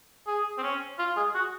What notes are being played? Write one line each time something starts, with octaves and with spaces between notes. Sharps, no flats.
G#4
C4
C#4
F4
G#4
F#4